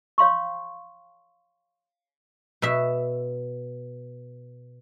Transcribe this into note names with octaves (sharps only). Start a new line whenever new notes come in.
C#5 F5 C6 C#6
B2 E5